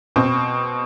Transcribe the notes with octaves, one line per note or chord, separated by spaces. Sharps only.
B2 C4